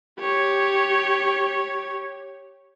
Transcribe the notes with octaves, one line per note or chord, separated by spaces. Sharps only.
G4 C#5